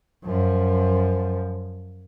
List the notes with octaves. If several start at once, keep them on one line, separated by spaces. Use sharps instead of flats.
F#2 F3